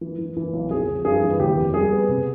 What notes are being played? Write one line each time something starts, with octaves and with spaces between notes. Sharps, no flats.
E3
E3
E3
B1
F2 G#4
F2
G2 G#4
E3
D#2 G4
F1
G3 G#4
B3
C3